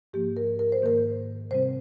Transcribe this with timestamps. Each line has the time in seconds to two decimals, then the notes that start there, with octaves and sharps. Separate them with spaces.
0.13 G#2 F3 A#3 G4
0.37 A#4
0.59 A#4
0.72 C5
0.82 G#2 D#3 A#3 A#4
1.51 C3 G3 C4 C5